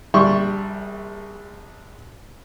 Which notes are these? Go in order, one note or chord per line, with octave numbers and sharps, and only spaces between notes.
A#1 G3 E5 C6 C#6